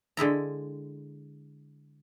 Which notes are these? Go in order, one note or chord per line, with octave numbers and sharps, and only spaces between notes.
D3 G#3 E4 A#5